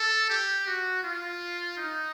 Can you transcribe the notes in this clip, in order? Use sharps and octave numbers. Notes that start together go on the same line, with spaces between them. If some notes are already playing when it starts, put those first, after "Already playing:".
Already playing: A4
G4
F#4
F4
D#4